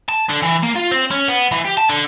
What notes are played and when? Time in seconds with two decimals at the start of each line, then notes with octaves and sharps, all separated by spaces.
0.09 A5
0.29 D3
0.43 E3
0.63 A#3
0.75 F4
0.91 C4
1.11 C#4
1.28 B3
1.52 E3
1.65 G4
1.78 A5
1.89 D3